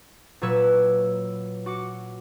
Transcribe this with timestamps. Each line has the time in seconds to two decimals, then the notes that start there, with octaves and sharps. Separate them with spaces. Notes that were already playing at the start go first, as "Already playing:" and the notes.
0.42 A#2 F#3 B4 C#5 E6
1.66 F#4 D6 C#7